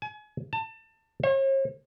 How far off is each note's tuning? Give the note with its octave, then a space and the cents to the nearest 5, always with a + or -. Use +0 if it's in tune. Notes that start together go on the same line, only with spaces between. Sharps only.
G#5 +35
A5 +25
C#5 -45